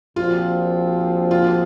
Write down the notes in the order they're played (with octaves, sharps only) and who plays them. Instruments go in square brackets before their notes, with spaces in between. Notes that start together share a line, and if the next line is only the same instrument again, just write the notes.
[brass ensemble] A#1 A#2 F3 C4 F#4 [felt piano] F4
[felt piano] F4